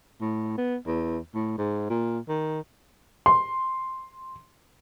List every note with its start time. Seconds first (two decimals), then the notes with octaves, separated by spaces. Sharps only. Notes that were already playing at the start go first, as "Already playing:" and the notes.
0.21 A2
0.58 B3
0.87 E2
1.34 A2
1.58 G#2
1.90 A#2
2.28 D#3
3.26 C6